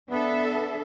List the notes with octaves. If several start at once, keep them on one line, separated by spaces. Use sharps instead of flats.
B3 D4 A4 E5